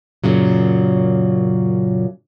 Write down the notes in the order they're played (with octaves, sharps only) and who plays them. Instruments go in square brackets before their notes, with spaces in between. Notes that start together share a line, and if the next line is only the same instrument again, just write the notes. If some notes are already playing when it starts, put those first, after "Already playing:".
[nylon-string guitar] F#2 A#2 C#3 F#3